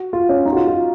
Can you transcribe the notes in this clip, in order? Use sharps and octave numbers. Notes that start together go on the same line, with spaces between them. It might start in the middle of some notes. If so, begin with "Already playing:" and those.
Already playing: F#4
F4
C#4
D#4
F#4
F4
F4